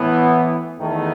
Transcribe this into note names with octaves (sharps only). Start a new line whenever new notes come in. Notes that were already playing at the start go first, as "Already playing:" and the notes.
Already playing: A2 E3 B3
E2 D#3 A3